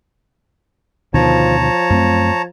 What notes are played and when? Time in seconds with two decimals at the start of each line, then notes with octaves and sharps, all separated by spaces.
1.14 D2 B2 D#3 F3 C#5 A5 A#5
1.60 F3
1.90 F#2 A3 C4